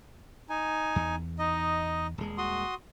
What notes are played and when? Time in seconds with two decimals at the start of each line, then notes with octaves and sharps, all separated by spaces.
0.50 D#4 G#5
0.96 E2
1.39 D#4 D#5
2.18 D#1 G#3
2.38 F#4 C6 D#6